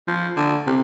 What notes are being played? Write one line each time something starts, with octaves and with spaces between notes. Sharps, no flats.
F3
D3
C3